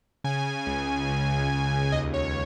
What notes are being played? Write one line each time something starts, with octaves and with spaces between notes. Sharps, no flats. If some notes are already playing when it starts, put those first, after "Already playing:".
C#3 G#5
C#2
C#2
C#2
D#2 D#5
C#5